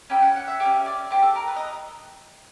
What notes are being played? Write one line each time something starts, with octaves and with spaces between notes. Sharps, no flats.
C#4 E4 G4 G5
F#5
F#5
E5
E4 G4 E5
C#4
D5
D4 G4 C5
A4
A#4
B4
D#5